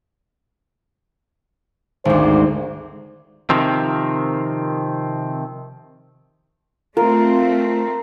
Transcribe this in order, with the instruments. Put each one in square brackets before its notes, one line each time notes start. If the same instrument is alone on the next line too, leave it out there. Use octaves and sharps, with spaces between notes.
[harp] G#1 D2 [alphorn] C5
[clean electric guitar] C3 D#3 F3 C4
[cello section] A3 C4 [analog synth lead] F4 [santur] A#4